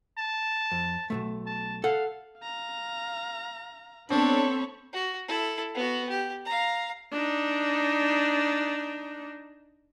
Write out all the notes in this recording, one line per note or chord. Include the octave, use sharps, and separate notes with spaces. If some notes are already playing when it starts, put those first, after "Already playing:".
A5
F2
B1 G#2 A3
A5
A4 F5 F#5
F5 A#5
B3 C4 D4 A4 C#5 B5 C#6
F#4
E4 A4
B3 F#4
G4
F5 A#5
D4 D#4